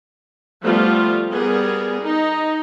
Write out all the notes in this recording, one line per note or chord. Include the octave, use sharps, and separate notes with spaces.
F3 G3 A3 B3 F4
G3 B3 G#4 A#4
D#4